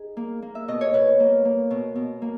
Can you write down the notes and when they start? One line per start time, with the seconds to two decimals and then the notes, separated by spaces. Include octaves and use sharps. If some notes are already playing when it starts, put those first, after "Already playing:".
Already playing: D#4 G#4
0.17 A#3
0.42 A#3
0.55 E5
0.68 B2 D#5
0.81 C#5
0.94 B2 B4
1.20 A#3
1.45 A#3
1.71 B2
1.95 B2
2.22 A#3